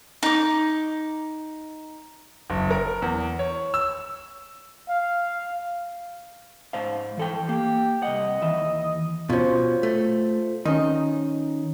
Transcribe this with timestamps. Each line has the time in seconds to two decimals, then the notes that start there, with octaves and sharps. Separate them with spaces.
0.23 D#4 D6
2.50 F#1
2.71 A#4
3.02 E2
3.39 C#5
3.74 E6
4.89 F5
6.73 G#2 C5 F5
7.17 E3 A4 G5
7.49 A#3 G4
8.02 C2 F2 D#5 F#5
8.42 D#2 E3 E5
9.30 B2 C#4 F4 C5
9.83 A3
10.65 D#3 C#4 D#4